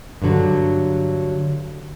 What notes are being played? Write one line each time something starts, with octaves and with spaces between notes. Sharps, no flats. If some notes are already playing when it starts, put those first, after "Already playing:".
G2 D3 F#3